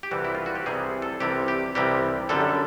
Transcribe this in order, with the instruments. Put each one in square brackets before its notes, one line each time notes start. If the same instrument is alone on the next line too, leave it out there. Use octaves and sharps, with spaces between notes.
[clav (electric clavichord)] G4
C2 C3 E3 G3 F#4
E4
F4
F#4
G4
C2 C3 E3 G3 G#4
A4
C2 C3 E3 G3 G4
G4
C2 C3 E3 G3 G4
F#2 D3 G3 A4